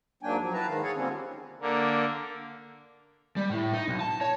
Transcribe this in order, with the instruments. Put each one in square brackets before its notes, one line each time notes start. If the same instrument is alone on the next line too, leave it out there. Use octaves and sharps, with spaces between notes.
[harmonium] G#2 F#3 A#3 D4 G5 G#5
F3 F#3
E4 B4 A5 A#5
G#2 D#3 F5
G#4 A4 C#5 F5 F#5 G#5
D3 F3 G3 A#3 C4 C#4
[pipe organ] D3 A#3
[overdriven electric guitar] G3
A2
D#4
B1
A5
C#5